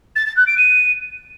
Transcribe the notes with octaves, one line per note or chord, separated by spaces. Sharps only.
A6
A6
F#6
D7
D#7